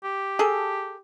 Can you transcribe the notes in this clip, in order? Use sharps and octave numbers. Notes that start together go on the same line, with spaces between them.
G4
G#4 A4